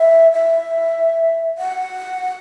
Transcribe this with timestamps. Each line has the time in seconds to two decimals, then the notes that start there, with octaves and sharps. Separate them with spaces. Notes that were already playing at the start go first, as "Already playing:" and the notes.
Already playing: E5
0.33 E5
1.58 F#5